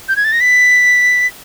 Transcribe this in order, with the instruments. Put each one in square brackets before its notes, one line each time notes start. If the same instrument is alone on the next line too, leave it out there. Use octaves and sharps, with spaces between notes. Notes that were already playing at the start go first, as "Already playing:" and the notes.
[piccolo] G6
G#6
A6
A#6
B6